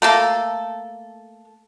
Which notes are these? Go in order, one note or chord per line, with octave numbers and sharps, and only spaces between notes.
A3 A#3 A4